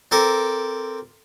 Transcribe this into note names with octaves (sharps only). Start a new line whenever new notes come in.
C4 A4 A#4 D6